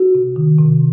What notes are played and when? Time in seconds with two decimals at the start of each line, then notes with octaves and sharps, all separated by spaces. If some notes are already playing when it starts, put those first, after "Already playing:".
Already playing: F#4
0.15 C3
0.36 D#3
0.58 C3